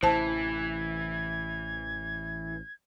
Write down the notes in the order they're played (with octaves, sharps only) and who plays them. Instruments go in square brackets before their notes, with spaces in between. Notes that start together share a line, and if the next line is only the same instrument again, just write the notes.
[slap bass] A1 C3 [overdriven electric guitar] E3 [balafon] C5 A5 [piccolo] G#6